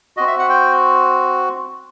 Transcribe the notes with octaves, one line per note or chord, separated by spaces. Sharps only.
C4 F#4 D#5
E5
F#5
G5